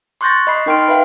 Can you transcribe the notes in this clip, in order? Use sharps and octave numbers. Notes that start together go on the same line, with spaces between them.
C6 C#6 F#6 G6 A6 A#6
D#5 B5 C7
D#4 A#4 G5 C6 F6 D7
B4 E5 F5 G5